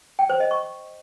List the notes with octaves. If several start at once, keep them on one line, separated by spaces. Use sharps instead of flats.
G5
C5
D#5
C#6